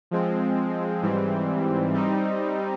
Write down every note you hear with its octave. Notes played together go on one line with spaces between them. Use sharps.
F3 G#3 C4
G#2 E3 G3 C4
G3 C4 D#4